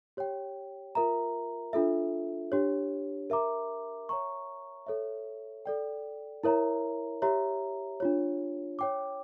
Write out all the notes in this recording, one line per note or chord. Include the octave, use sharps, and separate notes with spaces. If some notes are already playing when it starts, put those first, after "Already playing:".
G4 C#5 G5
F4 A#4 E5 A#5
D4 F4 A4 E5
D4 G4 C#5
A#4 E5 A#5 D6
C#5 E5 A#5 C#6
A4 C#5 E5
A4 D5 G5
E4 A#4 C#5 E5 A#5
G4 C#5 E5 A#5
D4 F4 C#5
C#5 G5 D6